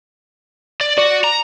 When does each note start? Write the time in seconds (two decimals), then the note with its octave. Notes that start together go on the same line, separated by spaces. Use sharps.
0.81 D5
0.98 F#4 D5
1.24 A#5